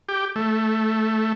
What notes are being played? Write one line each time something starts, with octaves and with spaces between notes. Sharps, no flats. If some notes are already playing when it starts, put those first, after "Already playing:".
G4
A3